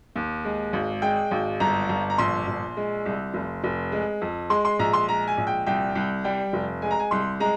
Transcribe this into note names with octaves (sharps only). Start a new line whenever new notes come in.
D#2
G#3
G#1
G#3 G5
G#1
G1 A#5
G1
A#5
A#1 C6
A#1
G#3
C2
F1
F1
G#3
F2
G#3 C6
C6
A#1 A#5
C6
G#3 A#5
G#5
A#1
G5
C2 G5
C2
G3 G5
F1
G#3 G#5
A#5
G#5
C2 C6
G#3 A#5